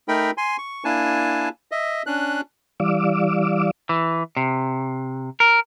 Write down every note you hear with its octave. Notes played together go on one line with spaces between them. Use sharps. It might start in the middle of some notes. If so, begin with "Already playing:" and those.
A3 D#4 A#4 G5 B5
G#5 C6
C#6
A#3 D4 E4 G#5 A5
D#5 E5
C#4 D4 F#6
E3 G3 D5 F5 D6 E6
E3
C3
A#4